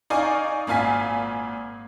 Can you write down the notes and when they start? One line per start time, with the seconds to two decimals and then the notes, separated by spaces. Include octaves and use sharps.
0.10 D#4 D5 F5 G#5 C#6
0.67 G#1 A#2 F5 G#5 B6